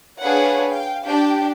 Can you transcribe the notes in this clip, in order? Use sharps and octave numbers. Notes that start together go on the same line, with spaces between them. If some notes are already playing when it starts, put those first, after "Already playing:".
D4 G#4 B4 C#5 F5 F#5
F5 G5
D4 G4 G5